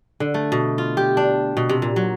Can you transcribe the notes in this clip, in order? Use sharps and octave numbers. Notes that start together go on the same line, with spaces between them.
D3
A3
B2
F4
G4
D4
B2
C3
A#2
F#3